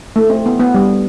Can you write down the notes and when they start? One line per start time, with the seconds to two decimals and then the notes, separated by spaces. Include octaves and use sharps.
0.16 A3
0.30 C4
0.46 B3
0.60 B3
0.74 G3